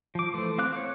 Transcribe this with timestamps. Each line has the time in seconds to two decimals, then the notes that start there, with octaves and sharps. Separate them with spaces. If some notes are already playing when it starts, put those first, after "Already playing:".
0.15 F3 D6
0.34 E3 A3 C5
0.58 C4 F5 D6 F#6
0.76 C#5